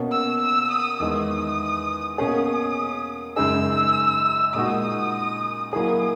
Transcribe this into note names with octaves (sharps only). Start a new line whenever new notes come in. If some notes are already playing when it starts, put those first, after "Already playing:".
Already playing: B2 A#3 C#4
E6
E6
D#6
E2 D#3 G#3 D#6
B2 A#3 C#4 G#4 D#6
F#2 C#3 G#3 D#4 G#4 E6
A#2 G#3 D#4 F#4 D#6
F#3 A#3 E4 G#4 D#6